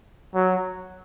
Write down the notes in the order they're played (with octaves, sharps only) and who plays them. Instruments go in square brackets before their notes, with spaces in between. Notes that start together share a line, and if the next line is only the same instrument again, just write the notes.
[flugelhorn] F#3